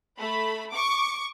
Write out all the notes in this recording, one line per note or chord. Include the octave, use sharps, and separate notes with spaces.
A3 B5
C#6 D6